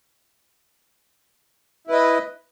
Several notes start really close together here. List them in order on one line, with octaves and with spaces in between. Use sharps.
E4 B4 D#5